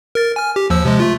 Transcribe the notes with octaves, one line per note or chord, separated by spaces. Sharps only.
A#4 A6
G#5 F6
G4
D#2 F3 E6
C3 F3 G#3
A3 F4